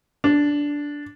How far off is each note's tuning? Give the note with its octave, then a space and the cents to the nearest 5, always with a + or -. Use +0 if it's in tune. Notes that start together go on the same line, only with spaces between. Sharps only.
D4 -10